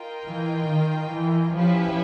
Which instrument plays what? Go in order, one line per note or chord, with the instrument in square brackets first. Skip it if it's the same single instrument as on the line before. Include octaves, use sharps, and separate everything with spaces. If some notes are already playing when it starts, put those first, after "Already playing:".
Already playing: [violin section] F4 A#4 D#5 G5
[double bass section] E3
D#3
E3
[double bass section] F3 [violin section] C#4 E4 G4 B4